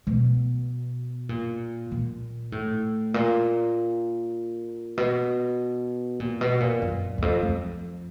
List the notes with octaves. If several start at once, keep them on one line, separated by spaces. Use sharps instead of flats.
B2
A#2
A#2
A2
A#2
B2
A#2
B2
A#2
F#2
E2
F2
F2